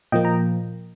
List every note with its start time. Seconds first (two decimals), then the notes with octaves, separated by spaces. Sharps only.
0.12 A#2 F3 A#3 D#5 G5
0.25 A#5